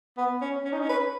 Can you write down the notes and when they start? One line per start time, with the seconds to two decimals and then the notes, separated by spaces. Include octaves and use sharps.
0.17 B3
0.42 C#4
0.65 C#4
0.72 D#4
0.80 C#4
0.89 B4